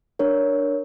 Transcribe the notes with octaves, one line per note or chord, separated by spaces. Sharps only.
D4 A#4 C#5